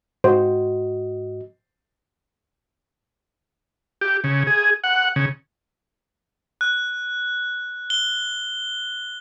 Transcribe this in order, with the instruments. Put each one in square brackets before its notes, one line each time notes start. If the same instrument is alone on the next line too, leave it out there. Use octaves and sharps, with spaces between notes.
[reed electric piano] G#2 F#4 D#5 [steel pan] C5
[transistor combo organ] G4
C#3
G#4
F#5
C#3
[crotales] F#6
G7